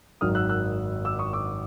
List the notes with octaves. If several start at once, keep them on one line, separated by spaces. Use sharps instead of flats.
G#1 F#2 D#3 F#3 D#6 F6
E6 F#6
E6 F#6
D6 E6
C#6 D#6
D6 E6